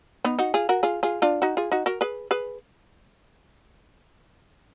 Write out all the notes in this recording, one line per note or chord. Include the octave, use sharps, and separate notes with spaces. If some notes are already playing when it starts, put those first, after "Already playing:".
B3 D#4
D#4 F#4
F4 G#4
F#4 A#4
F4 G#4
F4 G#4
D4 F4
D#4 F#4
F4 G#4
D#4 F#4
F#4 A#4
G#4 B4
G#4 B4